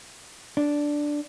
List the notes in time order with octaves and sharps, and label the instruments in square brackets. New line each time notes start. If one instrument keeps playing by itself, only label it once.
[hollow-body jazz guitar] D4